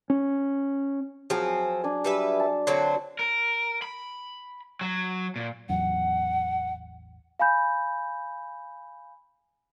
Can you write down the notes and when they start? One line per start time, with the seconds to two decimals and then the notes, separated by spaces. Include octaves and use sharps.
0.10 C#4
1.30 F3 F#3 C4 G#4
1.84 D4 G#5
2.04 G3 B4 E5
2.40 A5
2.67 D3 F#3 C4
3.19 A#4
3.82 B5
4.81 F#3
5.36 A#2
5.69 A1 E2 F#3 F#5
7.40 F5 G#5 B5 G6